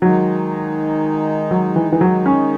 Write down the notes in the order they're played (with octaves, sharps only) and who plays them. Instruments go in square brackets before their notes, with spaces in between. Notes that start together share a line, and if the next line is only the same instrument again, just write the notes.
[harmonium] D#3 G#3 D#4 [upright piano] F#3
[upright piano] F#3
E3
E3
F#3
C#4